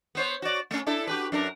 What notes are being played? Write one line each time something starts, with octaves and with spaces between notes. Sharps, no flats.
B3 C5 C#5
F#4 D5
A3 C#4
D4 E4 A4
F#4 G4 B4
F#2 D4 A#4